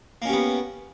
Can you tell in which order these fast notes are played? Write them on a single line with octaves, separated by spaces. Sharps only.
A#3 C#4 G4 B3